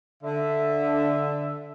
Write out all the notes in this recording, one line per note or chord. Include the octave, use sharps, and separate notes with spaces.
D3 E5